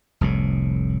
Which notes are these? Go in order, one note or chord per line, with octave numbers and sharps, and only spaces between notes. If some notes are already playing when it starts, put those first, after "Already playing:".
F1 C2 A2